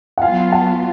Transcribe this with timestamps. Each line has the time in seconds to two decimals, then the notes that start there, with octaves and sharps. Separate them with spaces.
0.18 F#5
0.22 F#3 B3 F4 F5 G#5
0.52 F#5 A5